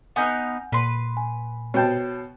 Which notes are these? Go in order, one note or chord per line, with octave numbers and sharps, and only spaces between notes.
B3 D#4 F#5 G#5 F6 G6
A#2 B4 C6
G#5
B2 C#5 G5 A5 G6